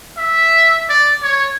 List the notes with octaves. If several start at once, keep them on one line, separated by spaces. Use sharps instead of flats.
E5
D5
C#5